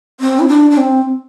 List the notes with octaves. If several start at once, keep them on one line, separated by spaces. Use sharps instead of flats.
C4
E4
D4
D4
C4